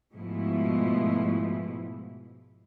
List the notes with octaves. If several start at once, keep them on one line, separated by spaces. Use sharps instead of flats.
G#2 B2 F3 G#3 A3 E4